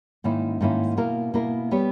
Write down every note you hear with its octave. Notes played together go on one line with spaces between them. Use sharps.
G#2 D#3 A#3 C#4 E4
G#2 D#3 A#3 C#4 E4
B2 A#3 E4 A#4
B2 A#3 E4 A#4
G3 B3 G4 C#5